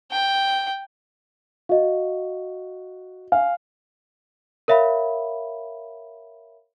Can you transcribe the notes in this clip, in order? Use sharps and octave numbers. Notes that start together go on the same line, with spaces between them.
G5
F#4 D#5 F5
F5 G#5
A#4 C#5 E5 F5 B5